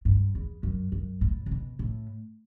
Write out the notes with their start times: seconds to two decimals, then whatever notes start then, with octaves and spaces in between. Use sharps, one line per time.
0.05 G2
0.35 E2
0.63 F#2
0.92 F#2
1.21 A2
1.46 C#3
1.51 B2
1.79 A2